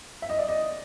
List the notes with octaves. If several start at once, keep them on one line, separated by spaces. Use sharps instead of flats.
E5
D#5
D5
D#5